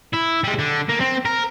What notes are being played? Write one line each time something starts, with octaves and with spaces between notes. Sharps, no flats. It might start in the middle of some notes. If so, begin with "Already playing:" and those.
E4
G3 G#3
D3
A#3
C4
A#4